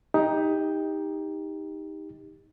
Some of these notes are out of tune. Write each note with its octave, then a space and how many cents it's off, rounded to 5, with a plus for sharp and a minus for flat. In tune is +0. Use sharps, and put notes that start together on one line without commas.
D#4 +15 G4 +20